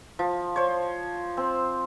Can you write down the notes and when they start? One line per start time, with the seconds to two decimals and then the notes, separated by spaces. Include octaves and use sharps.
0.19 F3
0.56 C5 C#5
1.37 C4